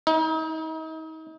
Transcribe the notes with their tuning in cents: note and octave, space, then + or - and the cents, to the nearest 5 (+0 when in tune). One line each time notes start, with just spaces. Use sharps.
D#4 +40